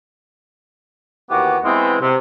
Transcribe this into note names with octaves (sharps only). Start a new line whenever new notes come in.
D#2 E3 B3 F#4 G4 D6
E3 G#3 B3 C4
C3